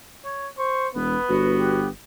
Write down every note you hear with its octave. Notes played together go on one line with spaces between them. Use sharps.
C#5
C5 C#6
E1 B3 B4
G1 F#4
G4